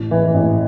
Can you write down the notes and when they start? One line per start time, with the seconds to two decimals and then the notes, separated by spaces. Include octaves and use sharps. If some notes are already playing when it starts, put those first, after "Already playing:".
Already playing: A1
0.11 E3
0.34 A1